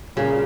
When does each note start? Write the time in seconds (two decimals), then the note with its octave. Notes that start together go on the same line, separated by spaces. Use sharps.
0.16 A#2 C#3 G3 C#4 F4 A#4